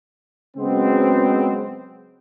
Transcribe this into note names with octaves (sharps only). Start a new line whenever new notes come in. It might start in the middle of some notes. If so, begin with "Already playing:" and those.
C#3 F#3 G#3 B3 C4